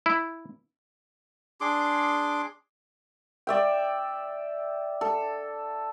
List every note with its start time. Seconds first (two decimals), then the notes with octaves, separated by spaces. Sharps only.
0.06 E4
1.61 D4 G#4 C6 D6
3.47 D5 E5 G5
5.01 A4